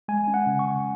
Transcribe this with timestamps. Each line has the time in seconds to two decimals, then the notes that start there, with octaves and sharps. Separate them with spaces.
0.08 G#3 G#5
0.28 C#4
0.34 F#5
0.47 C#3
0.59 C#6
0.66 C#3